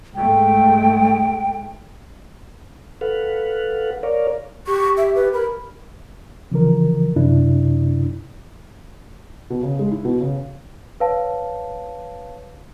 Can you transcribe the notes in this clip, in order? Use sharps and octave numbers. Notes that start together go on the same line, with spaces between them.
G#2 G#3 A3 G5
A4 B4 F5 F#5
A#4 C#5 D5 F5
G4 C#6
E5
B4
A#4 B5
C#3 E3 F3 A#4
F#2 C3 D4 E4
B2
C#3
G#3
E4
B2
C#3
B4 C#5 F5 A5